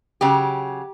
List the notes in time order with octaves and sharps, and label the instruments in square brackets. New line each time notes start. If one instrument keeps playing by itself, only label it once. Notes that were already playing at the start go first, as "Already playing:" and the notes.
[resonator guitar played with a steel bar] C#3 F#3 G4